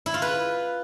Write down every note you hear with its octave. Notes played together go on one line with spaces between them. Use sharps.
E4
F4
B4